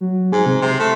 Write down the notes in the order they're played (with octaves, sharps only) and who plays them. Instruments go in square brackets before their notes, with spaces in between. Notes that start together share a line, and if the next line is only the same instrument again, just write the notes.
[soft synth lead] F#3
[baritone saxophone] G#2 [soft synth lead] G#4
[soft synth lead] C3
[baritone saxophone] C3 [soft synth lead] C6
[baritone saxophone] A3